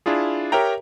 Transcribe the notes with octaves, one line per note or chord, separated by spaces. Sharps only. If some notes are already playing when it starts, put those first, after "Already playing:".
D4 E4 F4 G#4
G4 A#4 C#5 E5 G5 A#5